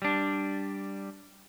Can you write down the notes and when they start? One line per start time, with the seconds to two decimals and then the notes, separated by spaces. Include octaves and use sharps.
0.02 G3 D4